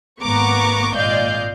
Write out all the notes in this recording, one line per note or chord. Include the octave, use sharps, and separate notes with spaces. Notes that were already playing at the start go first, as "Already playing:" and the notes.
G#1 A#3 B3 A#5 C#6 D6
G#1 A#2 D5 D#5 F5 G6